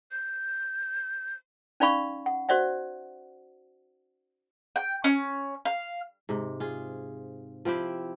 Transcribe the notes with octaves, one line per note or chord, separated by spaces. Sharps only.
G6
C#4 D#4 D5 F5 B5 C#6
F#5
F#4 C5 D5 E5 F#5
G5
C#4
F5
G#2 C3
F4 G#4
F3 C4 E4 G4